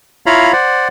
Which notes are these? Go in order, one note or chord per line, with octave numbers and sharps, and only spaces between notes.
E4 F4 C#5 F5 A#5 B5
C5 D5 F#5